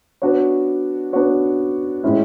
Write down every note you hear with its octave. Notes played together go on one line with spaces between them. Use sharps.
B3 D4 F#4 C#5
B3 D4 F#4 C#5
A2 G#3 C#4 E4